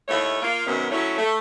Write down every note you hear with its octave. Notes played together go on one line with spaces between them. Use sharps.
D#2 A3 E4 C#5
A#3 F4
F#2 C3 D#3 B3 C#4
F#3 A3 C#4 E4 C#5
A3